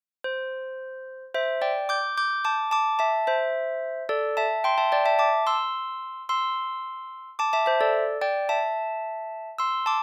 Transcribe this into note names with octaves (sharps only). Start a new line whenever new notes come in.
C5
C5 E5
D5 G5
D6 G6
D6 G6
A5 D6
A5 D6
E5 A5
C5 E5
A4 D5
E5 A5
G5 C6
E5 A5
D5 G5
E5 A5
A5 D6
C6 E6
C6 E6
A5 D6
E5 A5
C5 E5
A4 D5
D5 G5
E5 A5
C6 E6
A5 D6